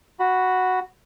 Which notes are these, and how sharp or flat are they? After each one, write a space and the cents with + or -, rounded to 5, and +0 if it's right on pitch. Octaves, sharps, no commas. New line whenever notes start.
F#4 +0 B5 +0